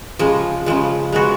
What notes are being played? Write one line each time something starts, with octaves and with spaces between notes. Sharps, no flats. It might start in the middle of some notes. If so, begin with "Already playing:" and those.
C#3 F3 G#3
C#3 F3 G#3
G#3 B3 F#4